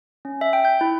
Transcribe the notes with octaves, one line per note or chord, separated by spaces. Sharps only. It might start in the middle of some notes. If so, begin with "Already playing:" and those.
C#4
E5
G5
G6
E4